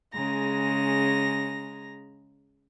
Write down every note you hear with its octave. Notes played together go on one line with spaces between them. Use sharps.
C#3 G#3 A#5 A#6